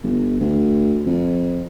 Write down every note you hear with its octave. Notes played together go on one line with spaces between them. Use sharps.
G1
D2
F2